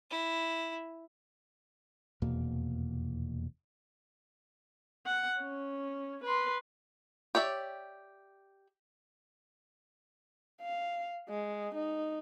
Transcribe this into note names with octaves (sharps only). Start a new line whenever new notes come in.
E4
F1 E2 B2 A#3
F#5
C#4
B4 C6
G4 C#5 D5 E5
F5
G#3
D#4